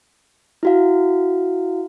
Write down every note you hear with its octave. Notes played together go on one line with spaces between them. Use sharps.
E4 F#4 F5